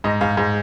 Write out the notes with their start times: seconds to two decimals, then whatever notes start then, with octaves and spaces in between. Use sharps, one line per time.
0.04 G#2 D#5
0.21 G#2 F5
0.37 G#2